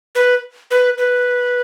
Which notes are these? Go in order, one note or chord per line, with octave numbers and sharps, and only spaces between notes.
B4
B4
B4